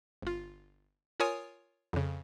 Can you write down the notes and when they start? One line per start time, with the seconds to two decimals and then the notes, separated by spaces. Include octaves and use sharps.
0.22 G1 F4
1.20 F4 A#4 C#5 G#5 D#6
1.93 F2 C#3